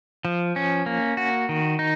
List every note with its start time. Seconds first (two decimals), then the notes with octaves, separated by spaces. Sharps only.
0.25 F3
0.56 C#4
0.86 A#3
1.17 F#4
1.49 D#3
1.79 D#4